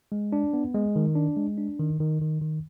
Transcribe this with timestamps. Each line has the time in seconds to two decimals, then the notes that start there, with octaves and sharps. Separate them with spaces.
0.12 G#3
0.32 D4
0.53 B3
0.74 G#3
0.96 D#3
1.15 D4
1.37 G#3
1.58 D4
1.79 D#3
2.00 D#3
2.21 D#3
2.41 D#3